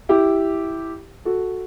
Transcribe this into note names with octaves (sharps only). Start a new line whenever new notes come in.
E4 G4
F#4 A4